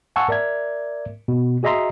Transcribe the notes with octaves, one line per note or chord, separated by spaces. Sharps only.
F5 F#5 G#5 A5 C#6 E6
A#4 D5 E5 G#6
B2
F#4 G#4 D#5 E5 A#5 C6